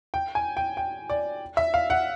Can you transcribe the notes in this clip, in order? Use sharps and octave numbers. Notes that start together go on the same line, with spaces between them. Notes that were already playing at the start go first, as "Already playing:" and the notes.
G5
G#5
G5
G5
D5
E5
F5
F#5